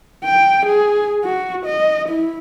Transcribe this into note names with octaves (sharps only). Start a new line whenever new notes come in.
G5
G#4
F#4
D#5
E4